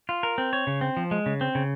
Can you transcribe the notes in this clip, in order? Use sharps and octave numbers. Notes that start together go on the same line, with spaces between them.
F4
A#4
C4
C#5
C#3
C4
F3
G#3
C#3
C4
C#3